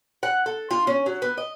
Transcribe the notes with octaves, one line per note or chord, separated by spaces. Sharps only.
F#5
A4
F4
C#4
F#3
B3
D#5